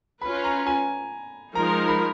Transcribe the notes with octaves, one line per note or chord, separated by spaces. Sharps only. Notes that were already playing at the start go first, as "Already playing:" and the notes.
C#4 F4 B4 B5
A#5
G#5
F3 G#3 D#4 A#4 A#5
B5